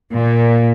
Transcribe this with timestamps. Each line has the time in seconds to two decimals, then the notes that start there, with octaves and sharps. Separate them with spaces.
0.14 A#2